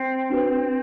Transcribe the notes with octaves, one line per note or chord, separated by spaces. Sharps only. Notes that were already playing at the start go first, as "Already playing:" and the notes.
Already playing: C4
D4 F#4 B4